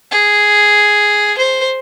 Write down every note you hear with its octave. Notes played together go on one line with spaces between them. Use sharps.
G#4
C5